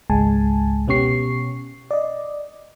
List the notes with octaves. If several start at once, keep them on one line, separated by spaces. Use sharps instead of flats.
G#1 C#2 G#3 G#5 A5
B2 B3 C#4 G4 C#6 C7
D5 D#5